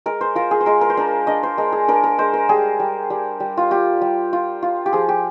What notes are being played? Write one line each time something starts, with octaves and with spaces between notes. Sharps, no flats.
G#3 A#4
C5
F4 A#4
G#4
C5
G#3 A#4
A#4
C5
D4 A#4
D4 D#5
C5
G#3 A#4
G#4
D4 A#4
A#4
G#3 C5
A#4
G3 G#4
G3
G3
G3
F4
F4 G4
G3
F4
F4
G4
F3 G#4
G4